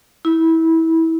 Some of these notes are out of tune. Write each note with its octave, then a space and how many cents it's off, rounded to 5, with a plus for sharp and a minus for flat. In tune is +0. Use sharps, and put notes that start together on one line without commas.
E4 -20